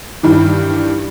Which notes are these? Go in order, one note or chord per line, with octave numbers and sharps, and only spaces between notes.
G2 D#3 E3